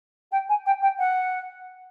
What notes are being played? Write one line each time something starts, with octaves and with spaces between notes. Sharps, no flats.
G5
G#5
G5
G5
F#5